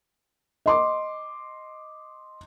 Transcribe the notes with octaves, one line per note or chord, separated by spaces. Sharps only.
D#5 C6 D6